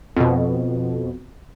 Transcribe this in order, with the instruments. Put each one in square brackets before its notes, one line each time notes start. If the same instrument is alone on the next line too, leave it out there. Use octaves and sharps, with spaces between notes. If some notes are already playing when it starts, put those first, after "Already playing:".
[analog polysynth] F2 B2